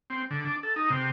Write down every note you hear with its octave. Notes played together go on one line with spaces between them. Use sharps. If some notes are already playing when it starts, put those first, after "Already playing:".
C4
D3
D4
A4
D#4
C3